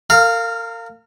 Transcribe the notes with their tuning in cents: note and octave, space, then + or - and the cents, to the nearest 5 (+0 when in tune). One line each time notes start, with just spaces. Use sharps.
A#4 -35 F5 +0